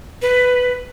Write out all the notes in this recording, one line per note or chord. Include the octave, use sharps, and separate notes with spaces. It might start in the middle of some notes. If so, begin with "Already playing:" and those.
B4